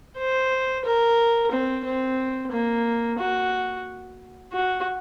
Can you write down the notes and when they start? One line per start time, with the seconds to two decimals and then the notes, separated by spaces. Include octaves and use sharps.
0.17 C5
0.85 A#4
1.52 C4
1.85 C4
2.51 A#3
3.18 F#4
4.52 F#4